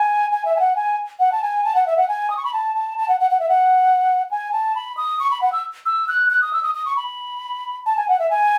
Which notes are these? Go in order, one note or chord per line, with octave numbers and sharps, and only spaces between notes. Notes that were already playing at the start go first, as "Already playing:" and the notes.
Already playing: G#5
G#5
E5
G#5
F#5
G#5
F#5
A5
G#5
A5
F#5
E5
F#5
G#5
D#6
C#6
B5
A5
A5
A5
F#5
F#5
F#5
E5
F#5
G#5
A5
B5
D#6
C#6
B5
F#5
E6
E6
F#6
F#6
D#6
E6
D#6
D#6
C#6
B5
A5
G#5
F#5
E5
G#5